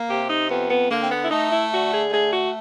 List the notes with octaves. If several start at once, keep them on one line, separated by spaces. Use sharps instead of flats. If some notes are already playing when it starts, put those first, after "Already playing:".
Already playing: A#3
C3 G4
D#4
F2 B3
B3
D3 A#3
C4
B3
E4
A3 D#4
E4
D3 F#4
G#4
A3 G#4
F#4